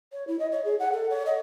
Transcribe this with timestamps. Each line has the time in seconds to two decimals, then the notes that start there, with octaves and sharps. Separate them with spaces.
0.13 C#5
0.27 E4
0.39 D#5
0.52 C#5
0.65 G#4
0.80 F#5
0.93 A4
1.10 C#5
1.26 D#5